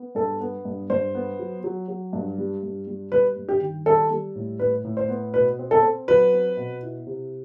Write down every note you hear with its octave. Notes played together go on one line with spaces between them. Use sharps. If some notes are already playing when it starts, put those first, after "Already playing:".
Already playing: B3
G2 A4
B3
G2
G2 C5
B3
F#3
F#3
F#3
G2
G3
G2
G3
G3 B4
G2
G4
D#3
G3 A4
G3
A2
A2 B4
A2
C5
B3
B2 B4
C4
A4
C4
F#3 B4
C4
B2
E4
C3